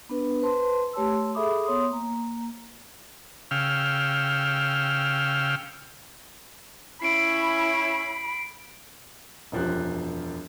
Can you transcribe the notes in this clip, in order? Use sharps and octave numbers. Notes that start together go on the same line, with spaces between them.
B3 D4 B4
B4 C5 A5 C6
A3 G4 C#5 A5 C6 E6
G#4 A4 E5 B5 D6 D#6
B3 C#5 C6 D#6
A#3 A#5
C#3 F5 G5 E6 F6
C#4 E4 B5 C7 D7
E1 F#2 F3 G4 F#6